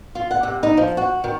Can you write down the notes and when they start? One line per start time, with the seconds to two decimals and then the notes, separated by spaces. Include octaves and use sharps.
0.15 F4
0.31 F#5
0.43 C3
0.63 D#4
0.77 F3
0.97 F#4
1.24 D#3